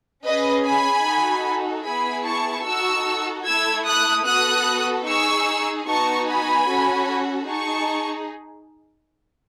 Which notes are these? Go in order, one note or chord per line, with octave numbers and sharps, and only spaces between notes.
C#4 G#4 B4 D#5
G#5 B5
D#4 F#4 A4
B3 E4 G#4 G#5 B5
A5 C#6
D#4 F#4 A4 C#6 E6
A3 E4 A4 E6 G#6
D#6 F#6
B3 F#4 A4 D#6 F#6
D#4 G#4 C#6 E6
B3 D#4 F#4 A5 C#6
G#5 B5
C#4 F#4 A4
D#4 G#4 A5 C#6